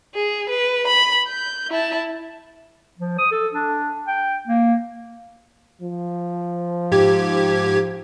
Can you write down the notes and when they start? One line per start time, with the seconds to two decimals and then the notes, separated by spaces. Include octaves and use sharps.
0.15 G#4
0.50 B4
0.87 B5
1.28 G6
1.70 E4 A5
2.98 F3
3.18 D#6
3.31 A4
3.54 D4
4.07 G5
4.47 A#3
5.82 F3
6.92 G#2 G4 G#6